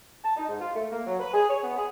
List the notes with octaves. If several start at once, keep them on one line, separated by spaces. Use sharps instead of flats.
A5
D#4
G#2
F4
A3
A#3
F#3
B4
G#4
C#5
B3
G#4